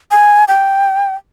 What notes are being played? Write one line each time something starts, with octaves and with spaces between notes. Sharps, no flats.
G#5
G5